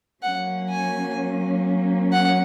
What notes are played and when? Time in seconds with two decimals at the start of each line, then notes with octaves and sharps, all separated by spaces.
0.23 F#3 A#3 C#4 F#5
0.70 G#5
2.12 F#5